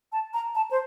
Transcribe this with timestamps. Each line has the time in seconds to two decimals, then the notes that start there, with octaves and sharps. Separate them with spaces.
0.12 A5
0.34 A#5
0.55 A5
0.71 C5